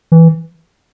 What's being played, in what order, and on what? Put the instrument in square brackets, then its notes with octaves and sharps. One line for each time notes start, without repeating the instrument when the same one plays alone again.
[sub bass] E3